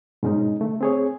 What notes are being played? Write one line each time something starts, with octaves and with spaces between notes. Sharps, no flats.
G#2 B2 G#3 C#4 D#4
D3 A3
C4 G#4 C#5